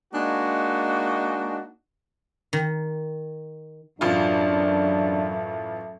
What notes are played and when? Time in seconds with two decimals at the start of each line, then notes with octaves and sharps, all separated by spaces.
0.13 G#3 A#3 D4 D#4 F#4
2.53 D#3
4.01 A1 F#2 A3 D4 F4